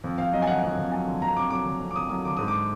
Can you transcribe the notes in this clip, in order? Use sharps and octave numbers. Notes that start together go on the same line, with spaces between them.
F2
F2 F5
F#3 D#5
G#5
D3 F#5
F2 F#5
F2
F#3 G#5
D3
F2 A#5
F2 D6
F#3 D6
D3
F2
D6
F2 D#6
F#3 D#6
D3 D6
G#2 D#6
D6